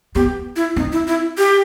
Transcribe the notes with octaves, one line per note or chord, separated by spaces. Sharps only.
B3 G4
E4
C4 D#4
E4
E4
G4